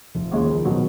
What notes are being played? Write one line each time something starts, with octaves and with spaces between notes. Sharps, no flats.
F1 F3
D#2 C#3 F3 G#3
D#3
C#2 F3
B2 F#3